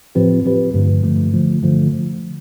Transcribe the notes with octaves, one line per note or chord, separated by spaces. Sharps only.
A2 F3 C4 G4 B4
A2 F3 C4 G4 B4
G2 D3 F3 A3
G2 D3 F3 A3
G2 D3 F3 A3
D3 F3 A3